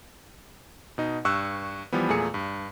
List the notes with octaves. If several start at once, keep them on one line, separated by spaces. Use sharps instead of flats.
B2 D#4
G2 C#6 E6 F#6
E3 F3 G3 B3
E2 A#2 A3 G#4 C#7
G2